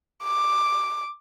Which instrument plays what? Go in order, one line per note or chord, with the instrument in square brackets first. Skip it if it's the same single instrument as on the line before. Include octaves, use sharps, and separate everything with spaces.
[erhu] D6